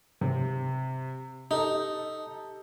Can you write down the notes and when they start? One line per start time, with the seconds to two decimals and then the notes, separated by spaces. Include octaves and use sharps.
0.21 C3
1.51 D#4 G4 A4